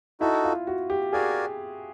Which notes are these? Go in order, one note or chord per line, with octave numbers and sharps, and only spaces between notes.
D#4 E4 F#4 A4
F4
F#4
G4
F#4 G#4 A#4 D5 F5 G#5